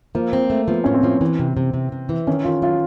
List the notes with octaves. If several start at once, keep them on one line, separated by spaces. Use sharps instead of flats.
F3 A#3
C4
A3
F3 B3
A2 C#4
C4
F3
E3
C3
C3
C3
C3
E3
D#3 C#4
D#3 F4
F#3 F4